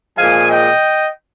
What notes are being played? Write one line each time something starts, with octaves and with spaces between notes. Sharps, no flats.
A#2 F3 G#3 F5 G#5
D#5 G5